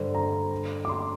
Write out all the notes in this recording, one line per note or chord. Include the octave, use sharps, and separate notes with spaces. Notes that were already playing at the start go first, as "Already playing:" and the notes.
Already playing: G2 D3 G3 C5
A#5
D6
C6